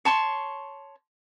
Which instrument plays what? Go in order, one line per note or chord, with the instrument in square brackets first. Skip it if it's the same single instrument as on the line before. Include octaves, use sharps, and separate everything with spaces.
[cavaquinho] C#5 A5 C6 C#6